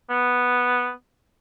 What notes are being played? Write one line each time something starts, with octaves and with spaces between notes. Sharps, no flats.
B3